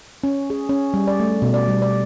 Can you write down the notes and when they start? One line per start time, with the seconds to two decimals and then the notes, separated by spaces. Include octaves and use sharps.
0.24 C#4
0.50 G#4
0.69 C#4
0.94 G3
1.07 D5
1.20 A3
1.42 B2
1.54 D5
1.68 G3
1.82 D5